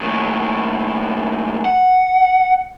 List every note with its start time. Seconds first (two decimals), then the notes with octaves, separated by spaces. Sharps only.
0.01 D#2 A2
1.65 F#5